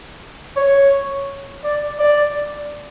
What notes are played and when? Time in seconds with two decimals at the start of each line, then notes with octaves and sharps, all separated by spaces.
0.56 C#5
1.64 D5
1.99 D5